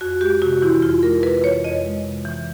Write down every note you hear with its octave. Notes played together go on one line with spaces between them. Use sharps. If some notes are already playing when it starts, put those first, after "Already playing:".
F2 F#4
G#3 G4
C3 F#4
E3 E4
F2 F4
G#3 A#4
C3 B4
E3 C#5
F2 D#5
G#3
C3
E3